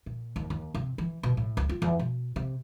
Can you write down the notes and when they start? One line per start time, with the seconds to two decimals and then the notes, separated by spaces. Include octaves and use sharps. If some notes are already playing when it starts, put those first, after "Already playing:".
0.06 A#2
0.36 D#2
0.50 D#2
0.75 C3
0.98 E3
1.23 B2
1.37 A2
1.57 C#2
1.69 F4
1.82 E2
1.99 B2
2.36 C3